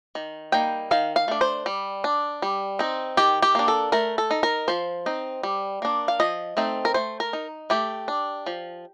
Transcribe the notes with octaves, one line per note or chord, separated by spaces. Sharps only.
D#3
G3 A#3 D#4 G5
D#3 F5
F5
A3 D4
C5
G3
D4
G3
C4 D#4
D#3 G4
G4
A#3 D4
A4
A3 A#4
A4
D#4
A#4
F3 C5
C4 D#4
G3
A#3 D4
F5
F3 D#5
A3 C4 D#4
A#4
A3 C5
A#4
D#4
A3 G4
D4
F3